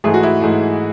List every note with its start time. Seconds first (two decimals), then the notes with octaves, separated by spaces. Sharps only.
0.04 G#2 E3 A3 G#4
0.14 F#4
0.23 E4
0.41 G#2 E3 A3